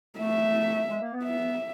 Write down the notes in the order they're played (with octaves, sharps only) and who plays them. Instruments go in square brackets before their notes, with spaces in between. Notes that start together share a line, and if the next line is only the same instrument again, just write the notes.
[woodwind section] A3 [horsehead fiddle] E5
[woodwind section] G#3
A#3
B3
[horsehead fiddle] E5